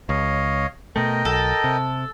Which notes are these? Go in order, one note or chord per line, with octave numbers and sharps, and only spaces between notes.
C#2 C#5 D#5 F5
B2 A3 A#4 D#5 G5
B1 A4
C3